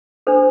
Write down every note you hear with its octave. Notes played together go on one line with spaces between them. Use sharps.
D4 A4 C5